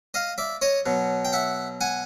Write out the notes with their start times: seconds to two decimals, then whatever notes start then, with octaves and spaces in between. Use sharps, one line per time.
0.14 D#5 F5
0.38 D5 E5
0.62 C#5 D#5
0.86 B2 F#3
1.25 G5
1.33 E5 F#5
1.81 F#5 G#5